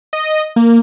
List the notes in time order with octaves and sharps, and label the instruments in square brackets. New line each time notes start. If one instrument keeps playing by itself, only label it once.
[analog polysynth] D#5
A#3